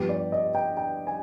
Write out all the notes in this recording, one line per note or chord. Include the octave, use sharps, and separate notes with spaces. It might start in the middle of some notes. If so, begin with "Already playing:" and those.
Already playing: G2 F3 B3 G4
D5
D#5
G5
G5
G#5